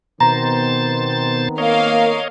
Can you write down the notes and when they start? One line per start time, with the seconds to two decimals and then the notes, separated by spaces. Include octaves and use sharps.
0.20 B2 D#3 B3 C4 C5 A#5 A6
1.58 A#3 A#4 C#5 D#5 F5